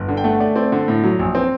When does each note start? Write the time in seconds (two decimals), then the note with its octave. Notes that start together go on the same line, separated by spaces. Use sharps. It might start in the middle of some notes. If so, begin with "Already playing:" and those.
Already playing: G1
0.08 D3
0.17 G5
0.24 A3 F#5
0.40 A3 D5
0.56 C4 D5
0.72 D3
0.88 A2
1.04 F#3
1.19 A#1
1.35 C4